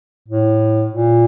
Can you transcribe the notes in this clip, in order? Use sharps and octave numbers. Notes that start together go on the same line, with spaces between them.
A2
A#2